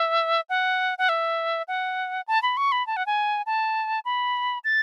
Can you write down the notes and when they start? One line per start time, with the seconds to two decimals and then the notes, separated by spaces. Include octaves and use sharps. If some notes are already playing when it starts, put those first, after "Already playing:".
Already playing: E5
0.50 F#5
0.98 F#5
1.09 E5
1.68 F#5
2.28 A5
2.42 B5
2.57 C#6
2.72 B5
2.87 A5
2.97 F#5
3.06 G#5
3.46 A5
4.05 B5
4.64 A6